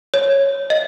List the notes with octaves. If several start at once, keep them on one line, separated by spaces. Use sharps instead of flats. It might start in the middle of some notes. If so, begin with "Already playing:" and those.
C#5
D#5